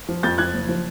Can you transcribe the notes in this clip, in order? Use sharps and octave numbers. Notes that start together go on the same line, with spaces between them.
F3
F2 G6 A6
F3 F#6 G#6
F#1
F3